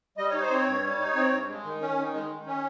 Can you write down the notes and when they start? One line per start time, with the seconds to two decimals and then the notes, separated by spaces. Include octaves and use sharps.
0.17 G3 D#5
0.30 D#4 C#5
0.42 C5
0.51 C4 C#5
0.66 G2
0.83 G3
0.99 D#4
1.15 C4
1.32 G2
1.48 G#3
1.65 D#3
1.81 C#4
1.98 D#3
2.14 G#3
2.30 D#3
2.46 C#4